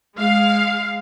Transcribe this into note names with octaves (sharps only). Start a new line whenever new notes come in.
G#3 F5